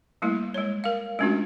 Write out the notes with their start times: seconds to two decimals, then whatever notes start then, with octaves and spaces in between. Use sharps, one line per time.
0.22 G3 A3 A#3 E4
0.54 G#3 C#5
0.84 A#4 F5
1.19 G#3 A3 C#4 D4 F4 F#4